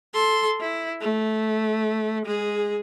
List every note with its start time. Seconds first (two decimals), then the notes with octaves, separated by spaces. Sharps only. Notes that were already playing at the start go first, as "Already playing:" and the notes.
0.14 A4 C6
0.60 E4
1.01 A3
2.25 G#3 G#4